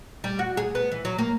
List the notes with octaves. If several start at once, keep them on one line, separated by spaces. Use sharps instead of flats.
G3
F#4
G#4
B3
E3
F#3
A#3